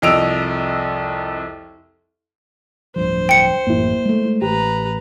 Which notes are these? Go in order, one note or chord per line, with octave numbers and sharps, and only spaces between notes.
C2 F2 D#5 E6 D7 F7
D1 G2 F3 C5
G5 C#7
A1 F#2 A#3 E4
G#3 A3
A1 G4 B4 A#5